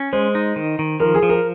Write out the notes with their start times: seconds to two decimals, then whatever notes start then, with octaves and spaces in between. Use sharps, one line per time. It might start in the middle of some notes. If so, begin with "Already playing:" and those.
Already playing: C#4
0.13 G#3 C5
0.35 D#4
0.56 D#3
0.79 D#3
1.00 F3 A#4
1.15 G#4
1.23 F3
1.29 A#4